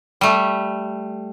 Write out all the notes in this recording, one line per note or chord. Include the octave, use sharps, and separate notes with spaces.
G3 A3